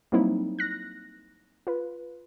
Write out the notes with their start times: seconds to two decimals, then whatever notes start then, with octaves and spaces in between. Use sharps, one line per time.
0.12 F#3 G3 A#3 C4 D#4 E4
0.59 F#6 A#6
1.67 F4 B4